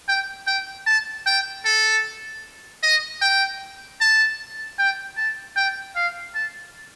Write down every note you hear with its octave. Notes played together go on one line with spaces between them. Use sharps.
G5
G5
A5
G5
A4
D#5
G5
A5
G5
A5
G5
F5
A5